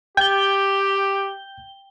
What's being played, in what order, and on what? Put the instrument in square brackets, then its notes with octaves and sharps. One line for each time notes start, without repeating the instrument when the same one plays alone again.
[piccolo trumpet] G4 [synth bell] G5 G7 [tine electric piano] G6